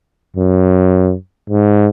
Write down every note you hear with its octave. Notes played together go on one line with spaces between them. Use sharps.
F#2
G#2